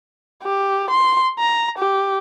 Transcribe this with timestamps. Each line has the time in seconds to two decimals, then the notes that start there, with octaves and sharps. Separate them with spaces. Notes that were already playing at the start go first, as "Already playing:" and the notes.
0.44 G4
0.90 C6
1.39 A#5
1.78 G4